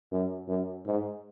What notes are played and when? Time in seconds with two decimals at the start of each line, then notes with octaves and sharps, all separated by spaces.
0.11 F#2
0.48 F#2
0.86 G#2